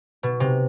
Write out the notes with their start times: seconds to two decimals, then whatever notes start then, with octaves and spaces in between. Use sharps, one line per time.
0.23 B2
0.40 C3